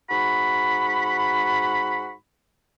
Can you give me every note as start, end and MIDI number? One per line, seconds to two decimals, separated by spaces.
0.10 2.13 44
0.10 2.13 66
0.10 2.13 83